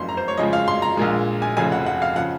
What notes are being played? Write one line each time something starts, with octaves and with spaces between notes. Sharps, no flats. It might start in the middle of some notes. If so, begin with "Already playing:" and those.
Already playing: F#1 F2 C#3 C6
A#5
C5
C#5
F2 C#3 F3 G#3 D#5
F5
C6
A#5
A#1 A#2 G#3
G#5
F1 F2 C#3 G#5
F#5
F#5
F5
C#3 F3 F#5